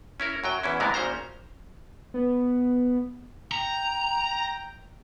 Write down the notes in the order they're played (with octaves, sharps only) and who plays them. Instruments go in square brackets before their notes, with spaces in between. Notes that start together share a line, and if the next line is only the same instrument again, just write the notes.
[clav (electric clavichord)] C#4 E4 A#4
F#2 F#3 G5
E2 E3 C#4 E4
G#2 C3 E3 G#3 B3 A#4
G#1 A#2 C#4 C5 A#5
[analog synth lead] B3
[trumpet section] G5 [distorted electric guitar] A#5